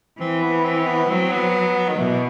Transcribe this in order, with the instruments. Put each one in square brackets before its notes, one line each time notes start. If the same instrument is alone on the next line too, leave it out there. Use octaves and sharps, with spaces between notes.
[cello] E3 [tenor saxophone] C4
[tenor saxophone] B3
C4
B3
[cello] F#3 [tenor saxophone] C4
[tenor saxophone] B3
D#3
[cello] B2 [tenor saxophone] E3